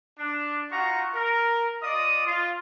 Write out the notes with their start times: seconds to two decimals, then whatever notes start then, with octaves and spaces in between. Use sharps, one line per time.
0.19 D4
0.71 D#4 F4 F#4 A#5 C#6
1.15 A#4
1.82 F4 D5 D#5 D#6
2.26 F4